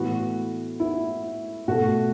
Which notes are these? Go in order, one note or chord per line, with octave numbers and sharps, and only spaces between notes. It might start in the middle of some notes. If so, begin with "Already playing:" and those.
Already playing: A2 E3 B3 F#4
E4
B2 A3 F#4